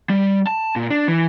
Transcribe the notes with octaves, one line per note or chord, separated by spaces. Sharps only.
G3
A5
A#2
D4
E3